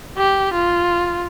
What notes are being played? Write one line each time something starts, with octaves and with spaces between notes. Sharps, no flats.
G4
F4